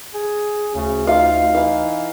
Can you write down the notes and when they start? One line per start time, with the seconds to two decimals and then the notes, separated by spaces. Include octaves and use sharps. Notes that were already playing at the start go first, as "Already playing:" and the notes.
0.14 G#4
0.75 D2 C#3
1.07 D#4 F4 F5
1.55 E3 F5